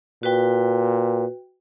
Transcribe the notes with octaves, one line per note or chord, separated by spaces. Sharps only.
A#2 F#4 B4 G5